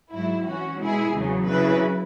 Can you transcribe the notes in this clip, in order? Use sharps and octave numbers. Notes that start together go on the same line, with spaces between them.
G#2 F#3 E4
E3 C#4 F#4
B2 G#3 E4 G#4
E2 C#3 F#3
C#3 F#3 E4 B4